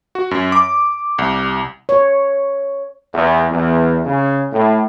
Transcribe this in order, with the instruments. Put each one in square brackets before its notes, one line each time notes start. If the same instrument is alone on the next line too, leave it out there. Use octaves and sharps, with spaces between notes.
[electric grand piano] F#4
F#2
D6
C2
[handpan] C#5
[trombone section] E2
E2
C#3
A2